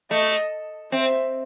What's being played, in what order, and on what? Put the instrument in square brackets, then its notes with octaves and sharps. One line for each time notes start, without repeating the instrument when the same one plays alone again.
[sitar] A3 [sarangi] D#5
[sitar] C4 [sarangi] E5